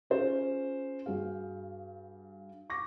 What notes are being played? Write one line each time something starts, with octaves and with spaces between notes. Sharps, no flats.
C#4 F4 G#4 C5
G2 F#4 G#4 F5
C#6 D6 A#6